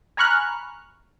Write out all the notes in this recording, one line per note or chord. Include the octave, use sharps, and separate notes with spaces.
G#5 A#5 B5 C#6 F6 F#6